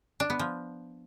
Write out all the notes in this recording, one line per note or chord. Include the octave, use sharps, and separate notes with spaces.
D4
B3
F3